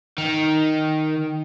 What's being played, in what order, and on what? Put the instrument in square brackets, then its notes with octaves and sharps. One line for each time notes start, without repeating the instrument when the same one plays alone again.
[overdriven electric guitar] D#3